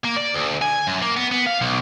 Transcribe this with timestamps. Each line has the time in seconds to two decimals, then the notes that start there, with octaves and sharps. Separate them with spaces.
0.04 A#3
0.16 D5
0.34 D2
0.62 G#5
0.87 F#2
1.02 A#3
1.17 B3
1.31 B3
1.46 F5
1.61 B1